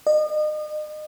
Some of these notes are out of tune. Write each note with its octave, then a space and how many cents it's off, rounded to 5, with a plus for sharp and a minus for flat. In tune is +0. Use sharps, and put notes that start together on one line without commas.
D#5 -35